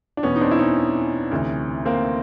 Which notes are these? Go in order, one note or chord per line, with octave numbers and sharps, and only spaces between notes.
D4
E2 B2 B3 C#4
D#4
C4 D4
E4
C#4 D#4
D2 C3 E3
A#3 C4